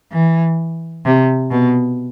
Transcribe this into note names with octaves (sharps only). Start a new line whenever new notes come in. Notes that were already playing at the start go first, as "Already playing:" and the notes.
E3
C3
B2